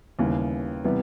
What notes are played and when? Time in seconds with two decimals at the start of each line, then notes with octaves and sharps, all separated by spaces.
0.19 D#2 C#3 E3 G3 B3
0.84 C3 E3 G3 B3